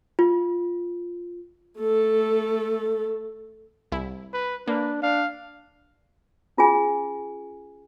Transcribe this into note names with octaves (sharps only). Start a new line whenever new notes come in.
F4
A3 A4
C2 E4
B4
A#3 D4 B4
D4 F5
C#4 F4 G#4 G#5